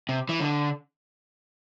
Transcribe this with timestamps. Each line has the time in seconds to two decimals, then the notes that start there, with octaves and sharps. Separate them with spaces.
0.09 C3
0.29 E3
0.40 D3